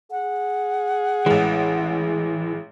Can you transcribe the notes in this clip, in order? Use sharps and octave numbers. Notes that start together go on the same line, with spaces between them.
G#4 F#5
A1 E3 G#3